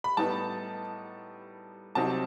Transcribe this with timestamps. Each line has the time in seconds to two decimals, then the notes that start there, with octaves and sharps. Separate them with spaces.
0.04 B5
0.17 A2 G3 B3 D#4 A5
1.95 C2 C3 F#3 C4 D#4 A5